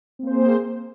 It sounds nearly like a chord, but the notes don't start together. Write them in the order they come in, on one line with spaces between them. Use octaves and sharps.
C4 A#3 C5 G#4